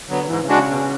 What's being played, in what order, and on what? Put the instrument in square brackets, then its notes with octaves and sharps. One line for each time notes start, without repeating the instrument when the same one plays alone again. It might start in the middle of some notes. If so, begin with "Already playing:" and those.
[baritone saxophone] D3 [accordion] F#3 B3
[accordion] G#2 [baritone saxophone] E3
[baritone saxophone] C#3
[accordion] G#3 D4 F#4
[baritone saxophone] C#3
[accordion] B2